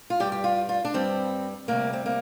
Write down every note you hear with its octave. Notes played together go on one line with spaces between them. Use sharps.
F4
G2 G3 G4
G4
F4
F4
D4
G2 G3 C4
D2 C3 G3 A#3
C4
A#3